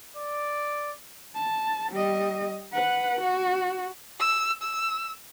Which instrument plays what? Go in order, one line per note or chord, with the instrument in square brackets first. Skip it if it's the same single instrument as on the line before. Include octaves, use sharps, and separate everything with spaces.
[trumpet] D5
[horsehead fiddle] A5
G3 D#5
B4 F#5
F#4
[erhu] E6
E6